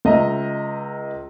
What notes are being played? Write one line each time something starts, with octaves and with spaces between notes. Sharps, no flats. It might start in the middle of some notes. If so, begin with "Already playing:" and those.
C#2 D#5 E5 A#5